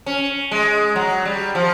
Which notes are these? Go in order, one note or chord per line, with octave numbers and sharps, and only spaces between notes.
C#4
G#3
F#3
G3
F3